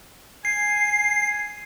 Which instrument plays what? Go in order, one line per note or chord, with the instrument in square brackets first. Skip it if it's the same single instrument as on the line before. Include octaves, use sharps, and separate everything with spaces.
[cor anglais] G#5 [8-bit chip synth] C7